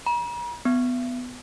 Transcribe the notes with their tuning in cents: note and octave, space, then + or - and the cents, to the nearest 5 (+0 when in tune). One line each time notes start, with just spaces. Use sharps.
A#5 +45
B3 +15